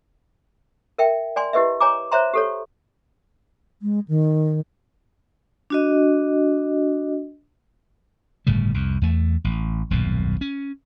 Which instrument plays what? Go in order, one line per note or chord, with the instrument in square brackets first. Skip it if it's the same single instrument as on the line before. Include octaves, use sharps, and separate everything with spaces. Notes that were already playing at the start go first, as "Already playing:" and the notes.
[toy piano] A#4 E5 G5
D5 G#5 C6
E4 G4 B4 D#5 E5
C#5 G#5 A#5 D6
C5 C#5 E5 A#5 C6
G4 A4 C#5
[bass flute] G#3
D#3
[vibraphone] D4 F#4 D#5
[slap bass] G1 A2 C#3 G3
C2 F2
E2 A3
A1
D#1 B1 F#2 A#2
C#4